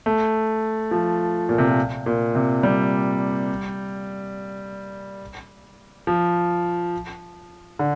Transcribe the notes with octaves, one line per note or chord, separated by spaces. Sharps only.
A3
F3
A#2
C3
A#2
A#2
C3
G3
F3
D3